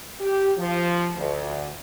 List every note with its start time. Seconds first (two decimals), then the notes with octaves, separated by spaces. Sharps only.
0.20 G4
0.57 F3
1.17 D2